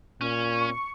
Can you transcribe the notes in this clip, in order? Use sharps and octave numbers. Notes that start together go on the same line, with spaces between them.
A#2 C#4
C#6